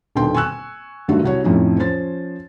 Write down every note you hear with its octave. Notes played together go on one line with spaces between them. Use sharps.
D#1 B2 D3 D#3 G5 C6
G#5 C#6 E6 F#6
G2 D3 D#3 F#3 A3 F#4
C2 F#4 C#5
F2 A2 F3 A3 C#4 D#4
F3 C#4 C5 A6